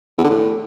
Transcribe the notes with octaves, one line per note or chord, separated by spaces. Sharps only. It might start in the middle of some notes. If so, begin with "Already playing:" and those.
E2
D3
A2